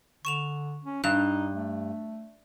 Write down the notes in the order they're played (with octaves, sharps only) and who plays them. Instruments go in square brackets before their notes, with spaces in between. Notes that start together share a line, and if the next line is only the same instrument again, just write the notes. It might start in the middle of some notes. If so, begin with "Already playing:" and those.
[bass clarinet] D3 [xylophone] C#6 E7 F7
[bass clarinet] C#4
[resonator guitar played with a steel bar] G2 [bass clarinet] D#4 [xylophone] F#6
[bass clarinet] A3